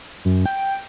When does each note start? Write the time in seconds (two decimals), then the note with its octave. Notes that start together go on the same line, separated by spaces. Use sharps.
0.25 F#2
0.46 G5